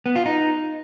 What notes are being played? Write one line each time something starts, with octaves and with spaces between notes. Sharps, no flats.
B3
F4
D#4